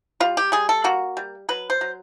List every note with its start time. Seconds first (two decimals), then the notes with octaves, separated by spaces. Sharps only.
0.20 G3 F4
0.37 G4
0.52 G3 G#4
0.69 A4
0.84 A#3 F#4
1.17 G3
1.49 F#3 B4
1.70 C5
1.81 F#3